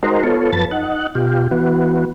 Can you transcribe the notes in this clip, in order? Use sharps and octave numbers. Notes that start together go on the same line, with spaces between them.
G#3 D#4 F#4 A#4 C5
B3 F4 A4 C#5
F#2 F3 B4 A5 A6
D#4 F#5
B2 F4 G4
E3 B3 F#4